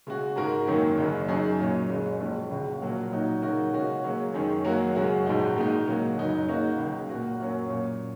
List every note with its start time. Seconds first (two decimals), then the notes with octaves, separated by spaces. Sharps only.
0.07 C#3 G#3 F#4
0.36 G#2 G#3 F#4 A#4
0.67 F#2 D#3 F#3 A#3
0.97 F#1 F#2 C#3
1.28 F#2 F#3 D#4 G#4
1.60 A#2 F#3 C#4
1.89 F#1 F#2 C#3 G#3
2.20 A#1 A#2 G#3 C#4
2.51 C#2 C#3 G#3 F#4
2.81 A#1 A#2 F#3 A#3 F#4
3.11 A#2 F#3 D#4 F#4
3.42 C#3 F#3 D#4 F#4 A#4
3.73 C#3 G#3 C#4 F#4
4.04 C#3 F#3 A#3 C#4
4.34 F#2 D#3 G#3 C#4
4.64 F#2 F#3 A#3 F#4 A#4
4.95 F#2 C#3 G#3 C#4 F#4
5.26 A#1 G#2 G#3 D#4 F#4
5.56 A#2 G#3 D#4
5.87 C#3 F#3 A#3 F#4
6.17 F#1 F#2 F#3 D#4
6.48 C#3 F#3 A#3 D#4 F#4
6.78 C#2 C#3 F#3
7.09 A#2 A#3 F#4
7.40 F#2 F#3 A#3 C#4 F#4
7.69 A#2 F#3 C#4